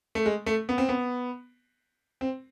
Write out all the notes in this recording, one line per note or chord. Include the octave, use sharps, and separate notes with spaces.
A3
G#3
A3
B3
C4
B3
C4